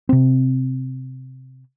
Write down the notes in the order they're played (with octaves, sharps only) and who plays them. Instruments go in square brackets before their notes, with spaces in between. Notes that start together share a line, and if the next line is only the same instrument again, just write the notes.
[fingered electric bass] C3 C4